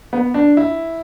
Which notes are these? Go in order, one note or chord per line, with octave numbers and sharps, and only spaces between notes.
B3
D4
E4